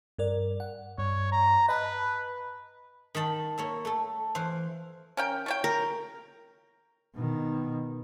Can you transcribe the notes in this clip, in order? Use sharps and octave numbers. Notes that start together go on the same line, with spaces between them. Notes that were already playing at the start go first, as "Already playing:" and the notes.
G2 A#4 D5
F#5
G2 C#5
A#5
B4 D#5 A5 F#6
D#3 G5 A5 B5
A#3 C#5 E5
A3 A4
E3 C5 F5
C#4 A#4 G5
A3 C#5 G5
A#4
B2 D#3